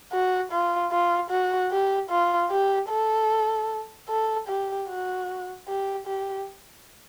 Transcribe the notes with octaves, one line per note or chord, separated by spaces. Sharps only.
F#4
F4
F4
F#4
G4
F4
G4
A4
A4
G4
F#4
G4
G4